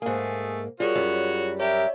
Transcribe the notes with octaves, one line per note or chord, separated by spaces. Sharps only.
G#2 A3 A#3 G#4
G3 F4 F#4 G#4 A#4 C#5
F#2 G3
G4 A#4 C#5 D5 E5